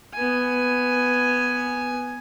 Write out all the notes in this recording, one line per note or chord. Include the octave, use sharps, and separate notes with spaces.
B3 G#5